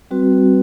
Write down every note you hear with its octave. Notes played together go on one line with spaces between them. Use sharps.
G3 C4 F#4 B4